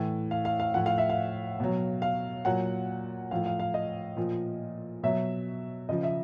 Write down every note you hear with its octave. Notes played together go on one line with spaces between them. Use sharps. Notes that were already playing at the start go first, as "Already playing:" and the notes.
Already playing: A2 E3
F5
F5
F5
A2 F3 F#5
F5
E5
F5
B2 F#3
F5
A#2 F#3 F#5
A2 F3 F5
F5
F5
D#5
A#2 F3
B2 F#3 E5
C#3 F3 D#5
E5